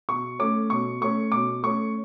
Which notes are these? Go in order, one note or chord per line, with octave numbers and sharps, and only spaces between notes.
B2 C#6
A3 C#4 D6
B2 C#6
A3 C#4 C#6
B2 D6
A3 C#4 C#6